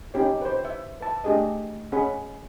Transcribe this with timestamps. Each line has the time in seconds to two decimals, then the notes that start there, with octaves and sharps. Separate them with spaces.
0.14 C#4 D#4 G4 C#5
0.42 B4 C5
0.65 E5
1.01 B4 E5 A5
1.24 A3 D4 G4 G#4 D#5
1.92 C#4 G#4 F#5 B5